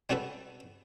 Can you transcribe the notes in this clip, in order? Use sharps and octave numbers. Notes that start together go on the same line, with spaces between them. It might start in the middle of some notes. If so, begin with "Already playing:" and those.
G3 C#4 F#4 A4 B4